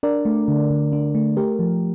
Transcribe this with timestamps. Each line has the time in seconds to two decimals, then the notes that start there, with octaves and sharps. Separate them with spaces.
0.03 D4 A#4 D5
0.25 A3
0.48 D3
0.71 D3
0.93 D4
1.15 A3
1.37 A3 G4 A#4
1.59 F3